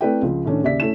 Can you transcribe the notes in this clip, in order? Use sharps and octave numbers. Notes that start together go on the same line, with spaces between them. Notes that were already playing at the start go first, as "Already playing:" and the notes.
A3 C4 E4 B4 D5 G5
C#2 F3
A2 D#3 A3 C#4 D4
D#2 C#3 D5 E5 B6
A3 C#4 E4 E7